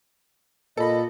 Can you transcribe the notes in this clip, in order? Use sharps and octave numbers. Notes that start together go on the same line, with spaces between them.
A#2 A4 D#5 B5